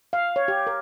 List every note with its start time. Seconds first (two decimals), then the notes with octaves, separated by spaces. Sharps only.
0.13 F5
0.36 C#5
0.48 G4
0.67 A#4